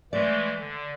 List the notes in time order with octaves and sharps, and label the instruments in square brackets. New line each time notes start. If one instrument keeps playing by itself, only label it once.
[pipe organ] E3 G#3 A3 [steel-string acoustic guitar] D5
[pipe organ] D3